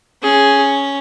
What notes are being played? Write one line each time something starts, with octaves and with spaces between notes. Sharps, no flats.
C#4 G#4